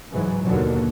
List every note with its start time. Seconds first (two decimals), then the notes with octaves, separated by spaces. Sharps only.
0.10 C#2 G#2 E3 F#3
0.43 D#2 B2 D3 F#3